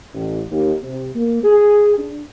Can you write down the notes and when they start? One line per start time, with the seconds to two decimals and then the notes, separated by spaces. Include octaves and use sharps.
0.14 A1
0.51 D#2
0.83 C3
1.15 A#3
1.44 G#4
1.98 D4